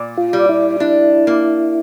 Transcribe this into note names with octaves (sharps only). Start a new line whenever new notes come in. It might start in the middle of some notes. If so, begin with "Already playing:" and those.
Already playing: A#2
F4
G3
E4
D4 E4
A#3